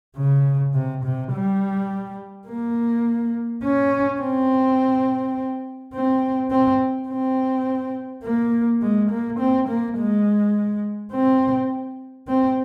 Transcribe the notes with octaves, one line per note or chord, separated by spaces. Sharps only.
C#3
C3
C3
G3
A#3
C#4
C4
C4
C4
C4
A#3
G#3
A#3
C4
A#3
G#3
C4
C4